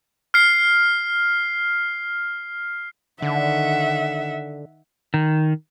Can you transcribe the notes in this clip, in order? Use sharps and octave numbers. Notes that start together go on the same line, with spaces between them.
F6 C7
D3 D#3 E5 F#5
D#3